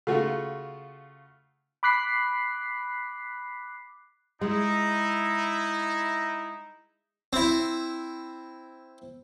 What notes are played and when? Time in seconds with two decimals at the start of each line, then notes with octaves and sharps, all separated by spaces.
0.07 C#3 A3 F4 F#4
1.83 B5 D6 F#6 B6 C7
4.41 G#3 D#4 E4
7.33 C4 E4